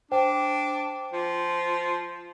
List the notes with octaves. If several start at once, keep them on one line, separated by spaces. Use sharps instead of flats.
D4 C5 G5
F3